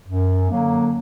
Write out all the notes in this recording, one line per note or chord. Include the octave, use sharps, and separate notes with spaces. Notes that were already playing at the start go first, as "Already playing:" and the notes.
F#2
D3 F#3 A#3